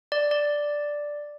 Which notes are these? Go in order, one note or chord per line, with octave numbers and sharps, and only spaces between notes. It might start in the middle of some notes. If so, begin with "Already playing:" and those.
D5
D5